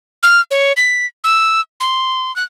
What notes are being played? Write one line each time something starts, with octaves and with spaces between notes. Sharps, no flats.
F6
C#5
B6
E6
C6
F#6